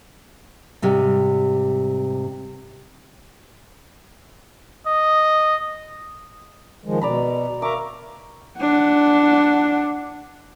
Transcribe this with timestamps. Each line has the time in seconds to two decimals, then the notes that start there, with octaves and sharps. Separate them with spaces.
0.82 G#2 C3 G3
4.87 D#5
6.85 D#3 F3 G#3
7.01 B2 D5 A#5 B5
7.62 A#4 E5 F5 A#5 C#6 D6
8.60 D4 F#5